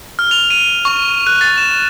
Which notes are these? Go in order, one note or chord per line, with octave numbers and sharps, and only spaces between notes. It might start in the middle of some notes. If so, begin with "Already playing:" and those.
F6
F7
D#7
C#6
F#6
A6
E7